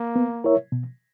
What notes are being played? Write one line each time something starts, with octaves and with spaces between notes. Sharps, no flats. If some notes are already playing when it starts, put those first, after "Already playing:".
Already playing: A#3
B3
E4 A#4 C#5 E5
B2